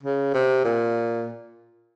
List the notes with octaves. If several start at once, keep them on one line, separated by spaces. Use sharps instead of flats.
C#3
C3
A#2